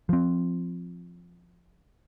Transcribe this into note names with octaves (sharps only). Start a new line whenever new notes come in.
F3 C4